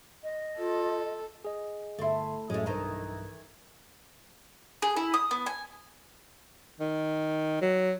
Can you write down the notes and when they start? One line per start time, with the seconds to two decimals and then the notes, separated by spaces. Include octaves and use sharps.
0.23 D#5
0.58 F4 A4
1.45 G#4 D#5
1.99 G1 A3 E4 C6
2.50 F#2 A2 F#3 G#3 A3
2.66 B1 G2 D#3 E3 A#5
4.82 G#4
4.97 E4
5.14 D#6
5.31 B3
5.46 G#5
6.80 D#3
7.61 F#3